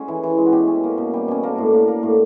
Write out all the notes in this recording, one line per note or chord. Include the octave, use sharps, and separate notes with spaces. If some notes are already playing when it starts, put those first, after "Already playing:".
Already playing: G#3 C#4 F#4
E3
E3
G#3
F#4
B2 G4
C#4
A#3
B2
G3
B2 C#4
A#3 D4
A2
A#3
A#3
A2